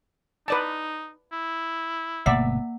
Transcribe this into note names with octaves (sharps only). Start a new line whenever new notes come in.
D#4 B4 D5 A5
E4
G1 B2 A3 A#3 D5 E5 F#5